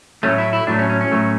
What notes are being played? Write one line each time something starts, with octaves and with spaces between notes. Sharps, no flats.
A2 F#3 A3 C#4
E4
E4
A2 F#3 A3 D4
C#4
C#4
C#4
A2 F#3 A3